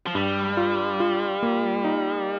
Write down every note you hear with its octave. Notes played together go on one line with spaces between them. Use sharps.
F3
G2 G3
F4
F4
A#3
D#4